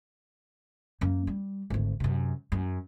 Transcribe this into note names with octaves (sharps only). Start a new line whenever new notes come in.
F#2 A#3
G3
G#1 D2
F#2 C3
F#2